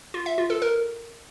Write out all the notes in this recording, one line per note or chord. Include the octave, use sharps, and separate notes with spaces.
F4
E5
F4
A4
A#4